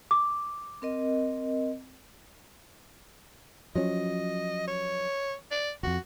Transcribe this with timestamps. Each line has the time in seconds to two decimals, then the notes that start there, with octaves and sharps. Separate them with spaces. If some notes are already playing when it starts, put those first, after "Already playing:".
0.11 D6
0.82 C4 A#4 D#5
3.75 F3 F#3 C#4 D#5
4.67 C#5
5.51 D5
5.83 E1 F2 F#4